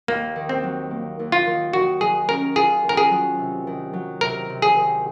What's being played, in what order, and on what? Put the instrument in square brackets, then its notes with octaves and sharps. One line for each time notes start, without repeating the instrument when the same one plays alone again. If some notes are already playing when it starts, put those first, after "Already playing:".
[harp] D#2 [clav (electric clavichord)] A#3
[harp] D#3
[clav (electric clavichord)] C4
[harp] F#3
A#3
D#2
[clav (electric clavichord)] F4
[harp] D#3
[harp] D#3 [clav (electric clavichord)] F#4
[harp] F#3 [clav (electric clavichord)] G#4
[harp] C#4 [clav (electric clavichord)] A#4
[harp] F4 [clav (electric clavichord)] G#4
[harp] D#3
[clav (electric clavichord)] A#4
G#4
[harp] F#3
C3
D#3
F#3
[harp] C3 [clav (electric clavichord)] A#4
[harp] C3
[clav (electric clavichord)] G#4
[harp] D#3